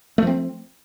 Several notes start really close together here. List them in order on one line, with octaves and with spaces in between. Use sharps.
A3 F3 C4